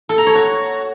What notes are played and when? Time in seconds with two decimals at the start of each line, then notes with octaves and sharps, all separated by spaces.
0.09 A4
0.18 A#5
0.27 C#5
0.35 F#4